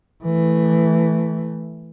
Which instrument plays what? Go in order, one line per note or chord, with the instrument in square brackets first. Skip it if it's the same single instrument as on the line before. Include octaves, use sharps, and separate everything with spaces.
[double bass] E3 A3